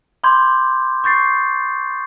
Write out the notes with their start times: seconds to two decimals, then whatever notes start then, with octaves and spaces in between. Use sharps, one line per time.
0.24 B5 C6 D6 G6 G#6
1.04 C#6 G6 A6 C7